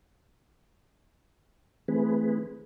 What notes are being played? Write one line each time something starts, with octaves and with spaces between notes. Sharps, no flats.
E3 A3 C4 G#4 B4